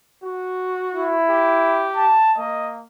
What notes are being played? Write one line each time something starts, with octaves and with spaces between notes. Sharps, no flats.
F#4
E4
G4
A5
A#3 D#5